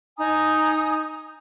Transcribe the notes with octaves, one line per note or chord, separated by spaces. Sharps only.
D#4 G#5 A#5 D#6